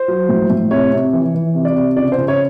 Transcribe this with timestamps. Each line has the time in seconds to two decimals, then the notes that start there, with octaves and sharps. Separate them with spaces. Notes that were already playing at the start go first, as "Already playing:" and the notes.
Already playing: C5
0.08 F#3
0.29 A2
0.50 A2
0.71 C3 C#5
0.92 C3
1.13 E3
1.34 E3
1.55 C3
1.65 D5
1.76 C3
1.97 C#3 D5
2.12 C5
2.18 C#3
2.28 C#5